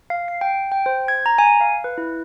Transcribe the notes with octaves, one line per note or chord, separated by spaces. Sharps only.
F5
C7
G5
G5
C5
G#6
A#5
G#5
F5
B4
E4